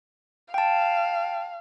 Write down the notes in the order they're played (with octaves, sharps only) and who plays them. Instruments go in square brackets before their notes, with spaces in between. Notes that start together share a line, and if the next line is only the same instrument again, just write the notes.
[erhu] F5 [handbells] G5 A5